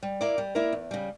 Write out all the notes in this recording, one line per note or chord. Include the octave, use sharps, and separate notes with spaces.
G3
A#3 E4 A#4 D5
G3
A#3 E4 A#4 D5
E2
C#3 G3